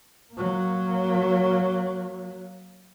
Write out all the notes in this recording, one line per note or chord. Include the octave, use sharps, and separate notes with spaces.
F#3 A#3